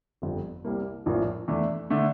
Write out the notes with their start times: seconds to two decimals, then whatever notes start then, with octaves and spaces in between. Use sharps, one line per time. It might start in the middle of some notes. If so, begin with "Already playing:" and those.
0.22 G1 F2 D3 G3
0.65 C2 C3 G3 A#3
1.06 A#1 A2 F3 A#3 D4
1.48 E2 E3 A3 D4
1.90 D3 A3 D4